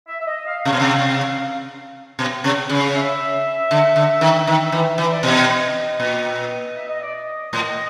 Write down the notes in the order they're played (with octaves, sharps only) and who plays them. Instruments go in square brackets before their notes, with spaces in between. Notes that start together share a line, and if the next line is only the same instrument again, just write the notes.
[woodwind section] E5
E5
D#5
F5
[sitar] C3 [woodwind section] F5
[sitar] B2
C3
B2
C3
C#3
[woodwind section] E5
[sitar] D3
D3
D#3
[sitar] D#3 [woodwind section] E5
[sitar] E3
E3
[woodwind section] D5
[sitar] B2 [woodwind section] D#5
[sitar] A#2
[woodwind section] E5
D#5
D5
D#5
[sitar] A2